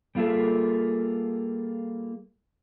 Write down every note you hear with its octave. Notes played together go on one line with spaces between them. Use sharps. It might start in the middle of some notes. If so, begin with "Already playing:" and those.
G3 A#3 F4 G#4 A4 E5